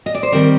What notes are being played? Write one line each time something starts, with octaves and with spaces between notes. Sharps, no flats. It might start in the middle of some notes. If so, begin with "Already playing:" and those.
D#5
D5
C5
D#3 G3 C4 A#4